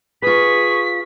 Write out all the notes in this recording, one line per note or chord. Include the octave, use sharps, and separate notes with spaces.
F4 G#4 B4 C#6 B6